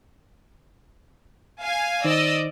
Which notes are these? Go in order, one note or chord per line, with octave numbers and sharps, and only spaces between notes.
F5 G#5
D#3 D#4 C5 D5 D#5 E6